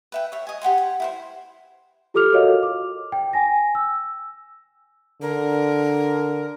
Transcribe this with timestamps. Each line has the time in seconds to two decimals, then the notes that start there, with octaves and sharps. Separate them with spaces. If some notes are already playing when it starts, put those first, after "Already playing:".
0.12 B4 E5 G5
0.32 C#5 E5
0.47 D#5 G#5
0.62 G4 F#5 G#5 C6
0.78 G5
1.00 E4 A#4 C5
2.14 F4 G4 A4 D6 F6 F7
2.32 F#4 A4 A#4 C#5 D#5 F5
2.63 D6
3.12 G5
3.33 G5 G#5 A#6
3.75 E6
5.22 D3 A#4